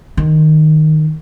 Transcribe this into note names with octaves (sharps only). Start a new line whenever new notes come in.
D#3